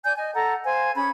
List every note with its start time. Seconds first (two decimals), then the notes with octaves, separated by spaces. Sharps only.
0.04 D5 G#5 G6
0.16 D#5 G#5
0.34 A4 F#5 A#5
0.65 C5 F5 G#5
0.95 C#4 G#4 B5 G#6